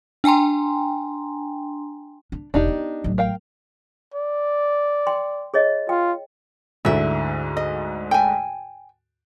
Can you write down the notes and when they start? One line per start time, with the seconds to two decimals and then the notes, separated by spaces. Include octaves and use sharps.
0.24 D4 G5 G#5 A#5 C6
2.32 D4
2.54 E1 D4 D#4 G4
2.68 B3
3.04 A1 F#3
3.18 A#4 F5 G5
4.14 D5
5.07 G5 C6
5.54 G#4 C#5 D#5
5.89 F4 G5
6.85 D2 G#2 D3 E4 E5
7.57 D#5
8.11 G5 G#5